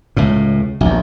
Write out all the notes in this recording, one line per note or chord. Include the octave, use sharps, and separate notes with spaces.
C#2 A2
A#1 D#2